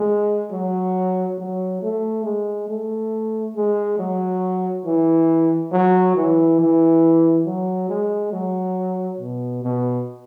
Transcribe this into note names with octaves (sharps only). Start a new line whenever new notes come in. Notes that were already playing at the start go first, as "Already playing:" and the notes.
Already playing: G#3
F#3
F#3
A3
G#3
A3
G#3
F#3
E3
F#3
E3
E3
F#3
G#3
F#3
B2
B2